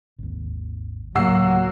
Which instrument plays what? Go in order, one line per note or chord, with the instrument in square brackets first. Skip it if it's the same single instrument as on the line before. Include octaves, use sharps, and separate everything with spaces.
[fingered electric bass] G#1 D#2
[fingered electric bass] D2 A2 C#3 [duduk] F#3 [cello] A#3 [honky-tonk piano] F#5 E6 C7